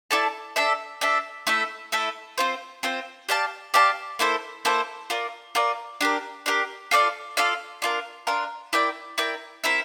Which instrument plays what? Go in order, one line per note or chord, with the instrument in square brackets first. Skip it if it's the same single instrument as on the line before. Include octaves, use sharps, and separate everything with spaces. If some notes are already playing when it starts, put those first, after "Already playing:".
[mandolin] E4 A4 D5 A5
D4 A4 E5
D4 A4 E5
A3 E4 A4 E5
A3 E4 A4 E5
C4 F4 C5
C4 F4 C5
G4 D5 F5 A5
G4 D5 F5 A5
A#3 E4 A4 C5
A#3 E4 A4 C5
F4 A#4 D5
F4 A#4 D5
D4 G4 A#4
D4 G4 A#4
F4 A4 D5 F5
F4 A4 D5 F5
D4 F4 A#4
D4 F4 A#4
E4 A#4 D5 G5
E4 A#4 D5 G5
C4 E4 A#4 E5